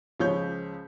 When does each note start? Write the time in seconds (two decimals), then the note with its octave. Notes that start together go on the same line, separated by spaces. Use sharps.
0.20 C#2 F3 C#5 G6